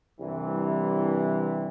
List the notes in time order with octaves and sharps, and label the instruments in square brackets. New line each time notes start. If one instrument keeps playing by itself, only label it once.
[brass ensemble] C2 G2 C3 E3